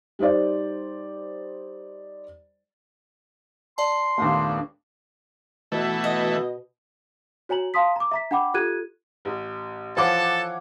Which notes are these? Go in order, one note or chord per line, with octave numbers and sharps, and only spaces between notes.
G3 D#4 C5 D5
D5 A5 C6
D#2 A#2 A3 B3 D4
B2 E3 A3
D#5
F#4 C#5 G#5 A#5 F#7
F5 A5 C6 D#6 B6
A#5 D6
E5 A#5 B6
D4 F#5 G5 B5 D6
F4 G4 A4 F#6 G#6 D#7
A1
E3 F3 F4 A4 C#5 F#5 A5 D6